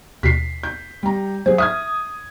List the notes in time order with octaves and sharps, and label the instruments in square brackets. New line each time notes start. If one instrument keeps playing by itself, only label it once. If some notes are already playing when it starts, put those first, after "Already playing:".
[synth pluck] D#2 B2 [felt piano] B6 C7
[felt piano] G6
G3 A#5
[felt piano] F#3 G#4 [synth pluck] C5
[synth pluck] E5 F6 [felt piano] D#6 G#6